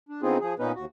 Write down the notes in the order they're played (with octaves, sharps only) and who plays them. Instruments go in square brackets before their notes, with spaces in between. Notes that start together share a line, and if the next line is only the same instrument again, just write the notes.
[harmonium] D4
D3 B3 C4 D#4 F4 G#4
F3 G#4
A#2 B3 C#4 D#4 B4
D#2 F#4